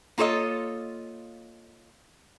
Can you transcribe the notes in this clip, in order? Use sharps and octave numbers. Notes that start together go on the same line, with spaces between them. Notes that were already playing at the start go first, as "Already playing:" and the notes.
A#3 F4 A4 C#5 D#5